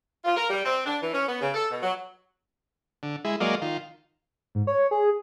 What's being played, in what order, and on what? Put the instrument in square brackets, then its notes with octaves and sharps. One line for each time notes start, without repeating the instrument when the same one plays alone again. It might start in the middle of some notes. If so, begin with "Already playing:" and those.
[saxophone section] F4
A#4
G3
C4
D4
E3
C#4
B3
C#3
A4
B2
F#3
[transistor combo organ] D3
G#3 E4
F#3 G#3 A#3 D5 D#5 F5
D#3 F4
[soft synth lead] G#2
C#5
G#4